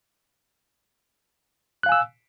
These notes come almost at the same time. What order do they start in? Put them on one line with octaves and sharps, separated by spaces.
F#6 F5 G#5 E6